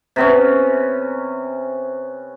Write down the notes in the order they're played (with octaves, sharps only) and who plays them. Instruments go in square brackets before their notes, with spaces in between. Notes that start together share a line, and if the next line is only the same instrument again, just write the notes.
[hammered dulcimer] C3 B3 C#4